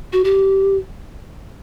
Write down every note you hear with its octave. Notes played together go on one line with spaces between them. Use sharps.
F#4
G4